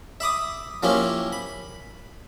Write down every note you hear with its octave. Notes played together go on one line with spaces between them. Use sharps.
E5 B5 D6 D#6
F3 A#3 C#4 E4 G4
B5